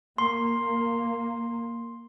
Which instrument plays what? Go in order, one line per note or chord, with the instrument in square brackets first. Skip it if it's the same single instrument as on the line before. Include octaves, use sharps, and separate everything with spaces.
[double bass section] A#3 [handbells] C6